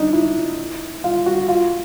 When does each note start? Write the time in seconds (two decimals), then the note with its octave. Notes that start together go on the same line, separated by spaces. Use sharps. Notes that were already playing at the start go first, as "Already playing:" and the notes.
Already playing: D4 D#4
0.13 E4
1.04 F4
1.26 F#4
1.48 F4